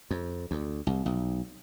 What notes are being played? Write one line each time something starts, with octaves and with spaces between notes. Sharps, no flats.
F2
D2
C2
B1